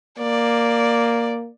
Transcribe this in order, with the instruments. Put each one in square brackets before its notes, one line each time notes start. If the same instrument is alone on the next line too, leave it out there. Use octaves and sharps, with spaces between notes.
[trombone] A#3 [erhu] D5